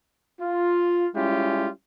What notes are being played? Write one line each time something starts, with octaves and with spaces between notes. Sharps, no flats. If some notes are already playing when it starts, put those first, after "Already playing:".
F4
G3 G#3 C#4 E4 F4 G4